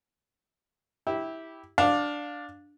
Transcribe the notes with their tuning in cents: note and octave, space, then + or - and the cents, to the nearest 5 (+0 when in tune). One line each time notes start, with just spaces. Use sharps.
E4 -15 G4 +0
D4 +0 D5 +5 F5 +20